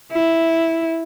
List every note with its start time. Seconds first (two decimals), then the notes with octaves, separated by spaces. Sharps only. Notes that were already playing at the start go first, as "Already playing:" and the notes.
0.12 E4